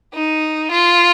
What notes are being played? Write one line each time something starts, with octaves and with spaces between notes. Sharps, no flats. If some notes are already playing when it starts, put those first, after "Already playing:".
D#4
F4